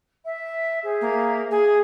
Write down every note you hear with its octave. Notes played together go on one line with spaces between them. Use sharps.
E5
G#4 C5 E5
A#3
G#4